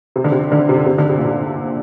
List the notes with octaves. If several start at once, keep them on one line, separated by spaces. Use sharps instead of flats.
C3
D3
C3
D3
C3
C3
D3
C3
A#2
C3